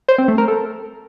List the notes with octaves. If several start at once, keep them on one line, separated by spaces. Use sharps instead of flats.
C5
C4
A3
A#4
A4